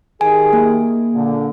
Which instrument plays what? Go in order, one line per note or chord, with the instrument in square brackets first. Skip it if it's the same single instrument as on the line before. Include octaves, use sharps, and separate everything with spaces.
[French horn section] D#3 G4 G#4 [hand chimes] G#5
[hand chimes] A#3
[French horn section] A#2 D3